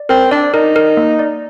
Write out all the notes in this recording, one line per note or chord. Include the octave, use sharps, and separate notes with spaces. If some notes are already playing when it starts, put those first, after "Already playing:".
Already playing: D5
C4 A#4
D4 D5
D#4 A#4
A#4
A#3
D5